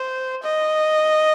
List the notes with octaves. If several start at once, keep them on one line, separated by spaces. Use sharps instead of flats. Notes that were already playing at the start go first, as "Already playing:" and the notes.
Already playing: C5
D#5